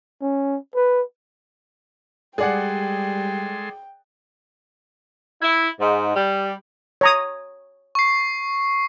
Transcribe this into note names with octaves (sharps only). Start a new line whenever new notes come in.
C#4
B4
G3 G#3 G#4 A4 D5 F#5 G5 C6
E4
G#2
G3
C#5 A#5 D#6
C#6 C7